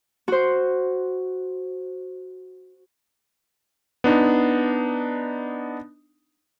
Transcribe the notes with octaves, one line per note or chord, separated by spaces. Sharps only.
F#4 C5
B3 D4 D#4